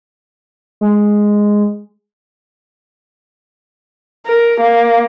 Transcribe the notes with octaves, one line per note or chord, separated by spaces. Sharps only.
G#3
A#4
A#3